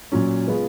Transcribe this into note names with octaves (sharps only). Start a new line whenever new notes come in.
A#2 F#3 C#4
C#3 G#3 B3 F4 B4